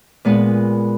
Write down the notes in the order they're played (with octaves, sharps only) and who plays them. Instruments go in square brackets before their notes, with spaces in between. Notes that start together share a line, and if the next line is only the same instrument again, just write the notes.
[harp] A#2 G#3 B3 B4